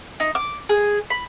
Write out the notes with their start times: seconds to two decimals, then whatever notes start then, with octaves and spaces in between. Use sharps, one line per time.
0.20 D#4
0.35 D6
0.69 G#4
1.10 B5